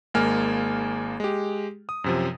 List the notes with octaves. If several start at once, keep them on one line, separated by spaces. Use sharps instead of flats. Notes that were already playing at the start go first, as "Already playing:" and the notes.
G#1 G#3 A#3 G#5 F6
G#3 G4
D#6
F#2 C3 F3